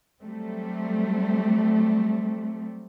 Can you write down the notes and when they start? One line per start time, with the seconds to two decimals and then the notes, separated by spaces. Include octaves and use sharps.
0.21 F#3 G3 A3 C4